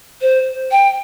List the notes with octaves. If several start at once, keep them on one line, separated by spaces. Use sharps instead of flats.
C5
G5